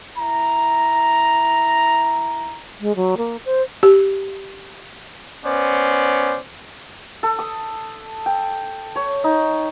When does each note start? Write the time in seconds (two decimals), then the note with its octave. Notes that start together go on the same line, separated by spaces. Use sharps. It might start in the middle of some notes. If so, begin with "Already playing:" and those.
0.18 E4 A#5
2.81 G#3
2.96 F#3
3.17 A#3
3.45 C5
3.83 G4
5.45 B3 C#4 C5 D5
7.23 A4
7.39 D#6
8.26 G5
8.96 C#5
9.24 D#4